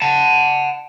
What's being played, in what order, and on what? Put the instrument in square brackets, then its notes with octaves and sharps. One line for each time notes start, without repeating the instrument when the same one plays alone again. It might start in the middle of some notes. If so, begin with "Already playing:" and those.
[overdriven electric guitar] F#5 A5